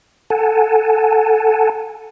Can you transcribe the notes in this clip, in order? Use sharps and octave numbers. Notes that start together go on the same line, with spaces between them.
A4 F#5 G#5 A5